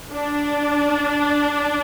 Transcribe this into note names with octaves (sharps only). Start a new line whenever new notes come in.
D4